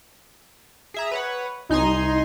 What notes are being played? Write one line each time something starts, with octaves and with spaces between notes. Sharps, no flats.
G#4 E5 A#5
B4 C#5 F#5
C2 D#4 G#5 A#5 C6